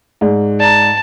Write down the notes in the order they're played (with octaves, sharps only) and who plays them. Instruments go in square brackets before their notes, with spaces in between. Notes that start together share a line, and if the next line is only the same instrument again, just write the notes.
[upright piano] G#2 [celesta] D#4 D5
[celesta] D5 A#5 [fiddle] A5